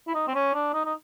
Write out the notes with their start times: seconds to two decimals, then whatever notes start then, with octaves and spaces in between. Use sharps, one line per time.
0.07 E4
0.15 D#4
0.28 C4
0.35 C#4
0.54 D4
0.74 D#4
0.85 D#4